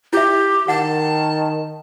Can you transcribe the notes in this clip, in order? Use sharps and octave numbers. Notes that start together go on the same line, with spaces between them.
E4 G4 E5
D#3 F#5 A5